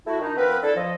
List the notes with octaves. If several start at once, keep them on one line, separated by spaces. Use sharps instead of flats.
A3 E4 F#4
D#3 D4 D#4
F3 B3 C4 A#4 B4
D4 E4 A4
F3 D#5